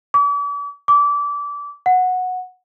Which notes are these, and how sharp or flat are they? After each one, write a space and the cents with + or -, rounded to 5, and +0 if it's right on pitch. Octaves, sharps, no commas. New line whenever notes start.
D6 -40
D6 -25
F#5 -10